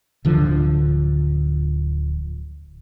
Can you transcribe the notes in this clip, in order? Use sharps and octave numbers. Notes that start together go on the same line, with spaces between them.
D1 D3 F3